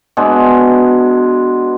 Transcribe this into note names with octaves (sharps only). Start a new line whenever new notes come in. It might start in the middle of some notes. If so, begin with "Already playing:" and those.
B2 G#3 D4